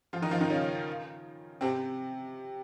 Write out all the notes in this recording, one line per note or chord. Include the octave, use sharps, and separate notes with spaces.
F3 F4
D#3 D#4
F3 F4
D#3 D#4
C#3 C#4
C3 C4